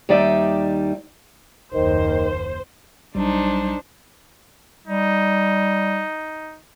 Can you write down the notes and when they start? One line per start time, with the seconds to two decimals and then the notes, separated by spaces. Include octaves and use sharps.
0.09 D#2 G3 D#4 D5 E5
1.74 F#1 D#2 D#3 C5
3.15 A#1 F#3 G3 D4 D#4 C5
4.87 G3 D#4